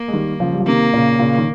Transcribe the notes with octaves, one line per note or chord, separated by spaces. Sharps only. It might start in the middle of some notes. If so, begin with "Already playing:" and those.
Already playing: A#3
G#3
D#3 G3
C#3 F3
G3
F3
C3 D#3 A#3
A#2 C#3
A#2 C#3
D#3